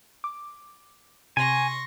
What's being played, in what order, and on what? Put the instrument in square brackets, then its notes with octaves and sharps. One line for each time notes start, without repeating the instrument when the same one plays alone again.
[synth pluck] D6
[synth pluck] C3 [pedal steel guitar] G#5 [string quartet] C6 C#6 A#6